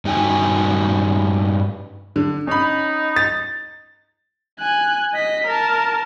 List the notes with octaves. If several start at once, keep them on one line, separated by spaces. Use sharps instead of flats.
G2 C#4 D#4 F#4 G5 G#5
D3
C#4 D#4 B5
A6
G#5 F#6
D#5 B6
A#4 A5